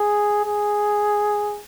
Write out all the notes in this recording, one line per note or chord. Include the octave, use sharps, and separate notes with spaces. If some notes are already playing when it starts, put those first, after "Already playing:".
Already playing: G#4
G#4